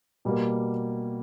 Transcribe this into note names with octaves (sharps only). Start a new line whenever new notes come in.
B2 G3 A#3